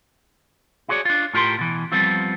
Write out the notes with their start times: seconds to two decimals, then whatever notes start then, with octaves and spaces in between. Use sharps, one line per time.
0.89 E4 F#4 G#4 A#4 C#5 D5
1.05 D4 F4
1.34 A2 F4 G4 A#4 C6
1.59 B2 E3
1.92 F3 G3 B3 C4 F4